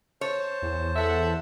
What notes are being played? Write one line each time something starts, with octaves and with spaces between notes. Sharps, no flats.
C5 C#5 A5
E2
A4 E5 F#5